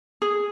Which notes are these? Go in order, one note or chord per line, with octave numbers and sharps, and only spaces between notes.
G#4